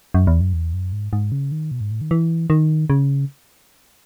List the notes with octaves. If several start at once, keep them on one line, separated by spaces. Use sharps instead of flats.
F#2
E2
F#2
E2
F#2
G#2
G#2
C#3
D#3
B2
G#2
A2
D#3
E3
D#3
C#3